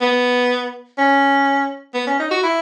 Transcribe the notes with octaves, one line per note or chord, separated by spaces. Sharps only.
B3
C#4
B3
C#4
D#4
F#4
E4